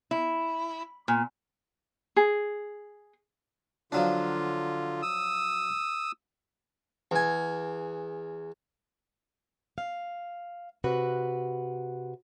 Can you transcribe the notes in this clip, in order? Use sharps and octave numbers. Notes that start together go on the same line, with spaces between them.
E4
A#2
G#4
D3 F3 F#3 D4 F4
D#6 E6
E2 G#5
F5
C3 F#4 B4